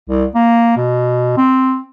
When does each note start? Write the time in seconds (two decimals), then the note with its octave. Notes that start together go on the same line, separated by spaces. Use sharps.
0.09 C2
0.35 A#3
0.77 B2
1.37 C4